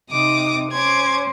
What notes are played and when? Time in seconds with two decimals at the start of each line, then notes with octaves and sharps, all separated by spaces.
0.11 C3 D#4 D6 D#6
0.72 C#4 C5 D6 G#6